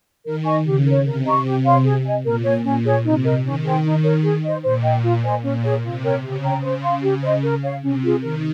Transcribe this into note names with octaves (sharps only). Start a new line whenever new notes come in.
D#3 A#4
D#5 G#5 C#6
C#3 G4
A#4 C#5
C3 A#4
D#5 A#5 C#6
G4
C#5 F5 C6
G#4
D#5 G#5
A#2 A#4
C#5 G#5
A#2 C#4
G#4 C#5
C3 D#4
A#4 D#5
D#3 C#4
G#4 C5 G5
D#4
A#4 C#5
G#4
C5 D#5
A#2 C5
D#5 G5
F4
C5 D#5 G#5
A#2 C#4
G#4 C#5
C3 F4
A#4 C#5 G5
C#3 G4
C#5 G5 A#5
C#3 C5
F5 C6
G4
C5 D#5
A#4
C#5 F5
C3 C#4
F4 G#4
D#3 A#4